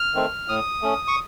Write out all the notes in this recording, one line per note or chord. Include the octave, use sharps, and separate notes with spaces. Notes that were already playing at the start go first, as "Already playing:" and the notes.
Already playing: F6
D#3 A3 C4
A2 D#6
A3 C#4
C#6